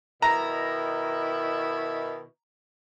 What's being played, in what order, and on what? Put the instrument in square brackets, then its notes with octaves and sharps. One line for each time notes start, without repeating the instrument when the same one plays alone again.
[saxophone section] B2 D#3 E4 [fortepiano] A#5